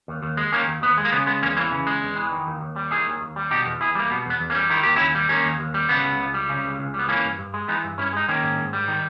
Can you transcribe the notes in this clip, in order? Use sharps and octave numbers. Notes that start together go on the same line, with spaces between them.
D#2
D#2
G#3
D#3 A#3 C#4
D#2
D#2 B3
G#3
A#3
C#3 B3
G#3 B3
E2 A#3 C#4
E3 A#3 C#4
C#3
G#3
E2
E3
D#3
D#2
D#2
G3
D#3 E4 G#4
D#2
D#2
G3
B2 D#4 G4
E2
E2 E4 G#4
G3 A#3
B2 B3
E2 B3
E2
A#3 C#4
G3
D#3 E4
D#2 G4
D#2 C#4 E4
G3
D#3 A#3 C#4
D#2
D#2
G3
C#3 B3
C#2
C#2
G3
C#3
C#2
C#2
G3 B3
E3 A#3 C#4
G2
G2
G#3
E3 B3 D#4
G2
G2 C#4 E4
G#3 D#4
D#3 A#3 C#4
G#2
G#2
G3
D#3